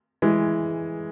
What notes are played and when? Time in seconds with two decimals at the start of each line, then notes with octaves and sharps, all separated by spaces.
0.22 E3 G#3